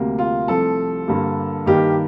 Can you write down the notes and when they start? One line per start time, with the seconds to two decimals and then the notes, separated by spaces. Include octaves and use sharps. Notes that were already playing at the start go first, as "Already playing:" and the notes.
Already playing: D2 C3 G3 A#3
0.19 F4
0.48 C2 C3 F3 A3 A4
1.08 G2 D3 G3 A#3
1.66 G2 D#3 A#3 G4